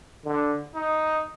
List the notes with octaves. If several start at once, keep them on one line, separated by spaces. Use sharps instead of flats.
D3
D#4